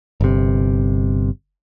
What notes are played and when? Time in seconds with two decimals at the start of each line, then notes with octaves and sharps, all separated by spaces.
0.21 G1 C3